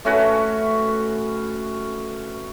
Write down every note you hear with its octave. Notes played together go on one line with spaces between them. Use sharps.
A3 C#4 F#4 B4